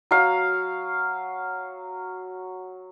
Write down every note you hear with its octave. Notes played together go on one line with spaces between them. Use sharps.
F#3 F5